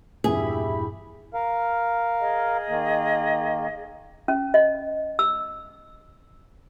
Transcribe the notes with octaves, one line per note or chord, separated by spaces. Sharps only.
E2 G2 A#2 E4 G4 G#4 B5
A#4 F5
G#4 D#5
D#3 A#3
C#4
D#5
E6